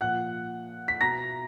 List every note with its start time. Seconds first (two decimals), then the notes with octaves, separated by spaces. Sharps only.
0.01 A#2 F3 F#5 F#6
0.88 B6
1.01 B2 A#5 A#6